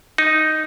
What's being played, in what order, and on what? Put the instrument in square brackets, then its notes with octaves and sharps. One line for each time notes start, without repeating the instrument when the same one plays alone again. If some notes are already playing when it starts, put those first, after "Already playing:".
[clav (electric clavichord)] D#4